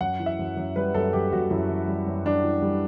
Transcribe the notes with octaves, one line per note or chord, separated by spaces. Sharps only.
F#2 F#5
E3
E5
F#2
F#2
G3 B4
F#2 A4
F#2 G4
F#2 F#4
F#2 E4
E3
G3
F#2
G3 D4
E3
G3